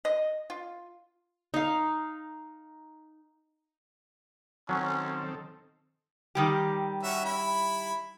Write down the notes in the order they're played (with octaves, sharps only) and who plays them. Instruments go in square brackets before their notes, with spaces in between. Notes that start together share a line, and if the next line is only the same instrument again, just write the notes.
[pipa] D#5
F4
[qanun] D#4 F5
[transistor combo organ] D#3 C4 A4 [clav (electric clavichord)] F#3 [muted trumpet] C#4
[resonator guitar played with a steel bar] D#3 G3 G4
[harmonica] C#4 F#4 E5
E4 B5